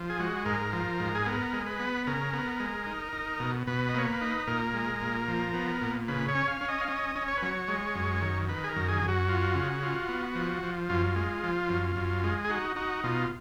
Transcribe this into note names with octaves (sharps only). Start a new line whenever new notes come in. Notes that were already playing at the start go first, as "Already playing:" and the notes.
Already playing: F3
G#4
G#3 F#4
G#2 A#4
F3
G#2
G#4
B3 A#4
G#3
B4
B3
C#3 A#4
B3
G#3
D#4
D#4
B2
B2 B4
D#5
A#3 C#5
B4
D#4
A#2 A#4
G#3
A#2
F3
B3
A#2
C#3 B4
C#5
C#4
F5
C#4
D#5
F5
C#4 D#5
C#4
C#5
B4
F#3 C#5
G#3
F#2
D#3
D#3 B4
G#4
A#4
F#2
G#4
F#2
F#4
F4
C#3
F4
B3
F3
F3
F#2 F4
G#3
F3
F#2
F#2
G#3
G#4
D#4 F#4
D#4 F#4
B2 F4